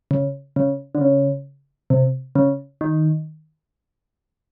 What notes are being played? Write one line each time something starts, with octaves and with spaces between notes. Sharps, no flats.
C#3
C#3
D3
C#3
C3
C#3
D#3